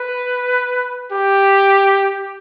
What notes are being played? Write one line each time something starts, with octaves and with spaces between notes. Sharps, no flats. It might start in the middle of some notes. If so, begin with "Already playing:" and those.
Already playing: B4
G4